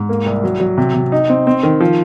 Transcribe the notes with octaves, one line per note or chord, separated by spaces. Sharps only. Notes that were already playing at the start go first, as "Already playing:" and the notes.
Already playing: G#2
A#3
C2
F#3
F#3
C3
C3
D#4
C4
C4
D#3
F3